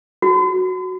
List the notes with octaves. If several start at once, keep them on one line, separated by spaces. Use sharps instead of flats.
F#4